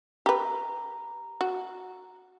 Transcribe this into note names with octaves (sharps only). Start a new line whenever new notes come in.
G4 B4 A#5
F#4